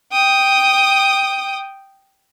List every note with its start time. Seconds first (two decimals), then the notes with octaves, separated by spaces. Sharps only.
0.12 G5 D#6